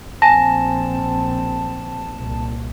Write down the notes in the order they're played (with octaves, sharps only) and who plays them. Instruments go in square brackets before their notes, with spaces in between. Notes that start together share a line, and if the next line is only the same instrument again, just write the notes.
[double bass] A#1 C4 [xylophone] G#5 A#6 [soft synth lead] A5
[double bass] C2 A#2